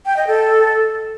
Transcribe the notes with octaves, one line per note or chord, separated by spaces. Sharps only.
G5
D#5
A4